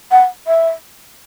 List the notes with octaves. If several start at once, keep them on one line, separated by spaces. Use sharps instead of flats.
F#5
E5